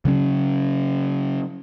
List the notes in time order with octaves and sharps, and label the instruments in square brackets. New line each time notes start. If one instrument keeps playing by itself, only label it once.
[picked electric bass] C#3 F#3 C#4